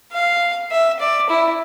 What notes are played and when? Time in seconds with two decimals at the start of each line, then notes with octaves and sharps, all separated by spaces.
0.13 F5
0.71 E5
1.00 D5
1.29 E4